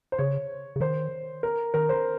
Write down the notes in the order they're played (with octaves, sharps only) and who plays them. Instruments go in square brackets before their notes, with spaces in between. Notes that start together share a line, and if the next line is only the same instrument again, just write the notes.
[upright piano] C5
[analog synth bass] C#3 [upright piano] C#5
[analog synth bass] C#3
[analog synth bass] D#3 [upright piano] C5
[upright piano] A#4
[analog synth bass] D#3 [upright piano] A#4
[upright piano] C5